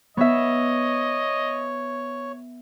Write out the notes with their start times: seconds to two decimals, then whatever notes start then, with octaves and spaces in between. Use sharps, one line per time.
0.17 B3 C#5 D#5 E5